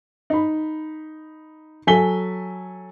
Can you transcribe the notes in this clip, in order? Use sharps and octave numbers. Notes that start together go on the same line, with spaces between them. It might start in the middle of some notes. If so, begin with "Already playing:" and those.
D#4 B5
F#3 A4 G#5 B6 G7